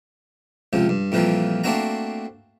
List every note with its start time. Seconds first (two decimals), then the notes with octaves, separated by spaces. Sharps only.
0.73 C#2 C3 F3
0.89 G2
1.12 F2 A#2 E3 F3 G3 A#3
1.64 A3 A#3 C4 D4 F#4 A#5